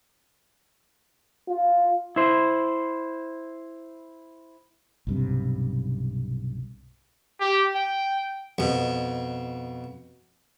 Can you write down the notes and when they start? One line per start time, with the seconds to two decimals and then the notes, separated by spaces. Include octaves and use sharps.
1.48 F4
2.16 E4 C5
5.07 B1 G2 C3
7.41 G4
7.75 G5
8.58 F2 B2